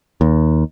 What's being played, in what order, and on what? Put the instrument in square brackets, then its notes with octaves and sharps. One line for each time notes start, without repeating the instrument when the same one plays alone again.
[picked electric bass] D#2